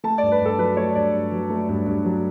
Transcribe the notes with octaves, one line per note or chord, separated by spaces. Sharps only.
A3 A5
G2 D5
B4
G2 A4
F#3 B4
A3 C#5
G2 D5
G2
F#3
A3
G2
G2
F#3